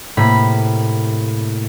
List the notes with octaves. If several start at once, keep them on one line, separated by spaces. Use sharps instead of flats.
A2 C3 A#3 B5